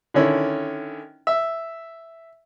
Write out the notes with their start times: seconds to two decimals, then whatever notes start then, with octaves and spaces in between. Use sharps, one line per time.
0.14 D3 D#3 C#4 E4
1.27 E5